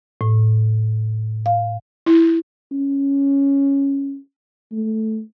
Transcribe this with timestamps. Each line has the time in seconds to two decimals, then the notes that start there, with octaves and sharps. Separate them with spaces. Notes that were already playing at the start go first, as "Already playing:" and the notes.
0.21 A2
1.46 F5
2.06 E4
2.72 C#4
4.72 A3